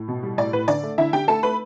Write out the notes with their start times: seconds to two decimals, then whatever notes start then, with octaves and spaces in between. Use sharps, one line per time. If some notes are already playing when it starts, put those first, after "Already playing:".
Already playing: A2
0.08 B2
0.23 G3
0.38 A2 D5
0.53 A2 B4
0.68 D3 D5
0.83 A3
0.98 D3 E4 E5
1.13 D3 G4 G5
1.28 A3 A4 A5
1.43 A3 B4 B5